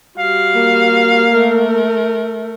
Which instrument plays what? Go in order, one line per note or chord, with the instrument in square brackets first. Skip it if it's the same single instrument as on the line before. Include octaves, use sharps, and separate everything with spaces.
[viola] G3 F#4 [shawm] F5
[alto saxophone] A#3
[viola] A3 A#4